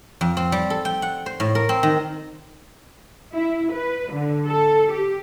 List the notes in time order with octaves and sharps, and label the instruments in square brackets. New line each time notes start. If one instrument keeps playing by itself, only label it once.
[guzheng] F2
C4
G3
A4
G5
F#5
C5
A2
A#4
C4
D#3
[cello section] E4
B4
D3
A4
G4